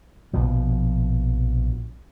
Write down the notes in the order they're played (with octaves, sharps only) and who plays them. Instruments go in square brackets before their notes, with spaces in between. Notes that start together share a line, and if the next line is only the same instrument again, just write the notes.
[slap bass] A#1 B2 F3